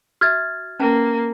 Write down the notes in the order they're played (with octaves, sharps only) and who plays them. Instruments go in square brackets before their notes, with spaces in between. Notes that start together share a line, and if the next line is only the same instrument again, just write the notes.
[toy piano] F#4 E5 [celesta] F6 G#6 A6
[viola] A#3 [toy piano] C#4 B4 A5